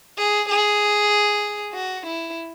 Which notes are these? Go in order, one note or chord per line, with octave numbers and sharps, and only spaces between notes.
G#4
G#4
F#4
E4